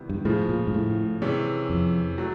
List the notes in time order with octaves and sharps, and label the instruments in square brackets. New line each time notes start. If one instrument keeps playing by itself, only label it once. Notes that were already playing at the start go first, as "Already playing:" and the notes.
Already playing: [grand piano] C3 D#3 G3 B3 E4
[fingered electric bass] G2
[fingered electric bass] A2 [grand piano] C#3 F3 G#3
[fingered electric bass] A#2
G#2
A2
[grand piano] C3 E3 G#3 C#4
[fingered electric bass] F2
[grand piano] F#3 A3